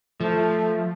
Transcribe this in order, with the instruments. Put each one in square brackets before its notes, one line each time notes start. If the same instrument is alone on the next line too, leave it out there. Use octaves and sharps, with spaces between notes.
[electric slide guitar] F3 [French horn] A3